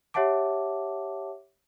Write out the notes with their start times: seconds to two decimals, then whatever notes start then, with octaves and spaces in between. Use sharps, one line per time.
0.14 G4 C#5 E5 F#5 A5 D6